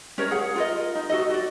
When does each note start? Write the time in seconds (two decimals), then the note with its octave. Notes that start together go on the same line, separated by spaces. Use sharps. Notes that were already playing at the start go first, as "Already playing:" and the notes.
0.18 C#4 A#4 C#5
0.31 G#4 F#5
0.56 F4 A#4 D#5
0.95 D#4
1.10 F#4 A4 D#5
1.30 F#4 D5